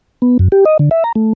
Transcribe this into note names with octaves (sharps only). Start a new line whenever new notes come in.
B3
F#2
G4
D#5
D3
E5
A#5
A3